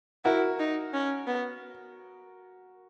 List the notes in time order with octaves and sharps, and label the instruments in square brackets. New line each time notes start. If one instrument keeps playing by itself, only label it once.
[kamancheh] E4 [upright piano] F#4 A#4
[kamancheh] D#4
C#4
B3